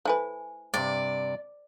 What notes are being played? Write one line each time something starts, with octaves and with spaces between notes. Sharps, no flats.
A3 E4 B4 C5 G#5
G2 C3 C5 D5